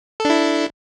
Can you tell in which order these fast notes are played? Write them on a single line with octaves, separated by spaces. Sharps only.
A4 D4 E4